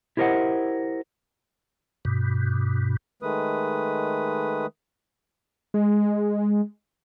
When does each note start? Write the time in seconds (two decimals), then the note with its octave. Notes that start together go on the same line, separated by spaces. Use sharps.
0.17 E4 G4 A#4 C5 D#5 F#5
2.05 G2 B2
3.22 D#3 G#3 A3 B4 D#6
5.74 G#3